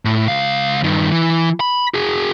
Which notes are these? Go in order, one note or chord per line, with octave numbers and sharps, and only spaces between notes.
A2
C#2 F5
G2 D#3
E3
B5
F#4 G#4